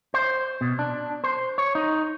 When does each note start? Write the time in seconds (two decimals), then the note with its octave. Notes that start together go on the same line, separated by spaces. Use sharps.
0.14 C5
0.61 B2
0.79 D4
1.24 C5
1.58 C#5
1.75 D#4